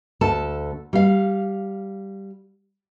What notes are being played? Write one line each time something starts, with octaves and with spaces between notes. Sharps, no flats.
D2 A4 A5
G3 F5